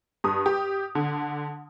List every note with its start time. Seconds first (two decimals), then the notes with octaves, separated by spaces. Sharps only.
0.24 G2 D#6
0.46 G4
0.95 D3